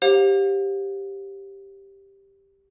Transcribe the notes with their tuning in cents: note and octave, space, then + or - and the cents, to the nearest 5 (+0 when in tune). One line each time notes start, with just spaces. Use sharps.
G4 +0 C5 +30 F5 +40